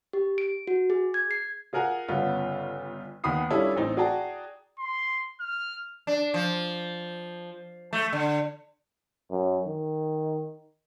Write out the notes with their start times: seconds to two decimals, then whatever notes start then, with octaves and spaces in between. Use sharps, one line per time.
0.13 G4
0.38 D7
0.67 F#4
0.90 G#4
1.14 G#6
1.31 C7
1.73 F4 G#4 A#4 F#5 G#5 A#5
2.08 G1 C#3 B3 F4
3.24 D#2 D#3 B3 B5 D#6 C7
3.50 G3 C#4 D4 E4 F4 A4
3.76 A1 C4 D#4 C5
3.97 F#4 G#4 D5 G5 A5 A#5
4.79 C6
5.40 F6
6.07 D4
6.34 F3
7.93 A3
8.13 D3
9.31 F#2
9.67 D#3